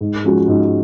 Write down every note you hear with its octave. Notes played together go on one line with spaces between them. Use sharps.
G#2
F3 G#3 C#4 F#4
G#2